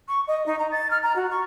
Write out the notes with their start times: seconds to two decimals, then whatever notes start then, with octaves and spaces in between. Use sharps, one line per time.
0.08 C#6
0.27 D#5
0.46 D#4
0.58 A#5
0.71 A6
0.90 F6
1.02 A#5
1.15 F#4
1.30 C#6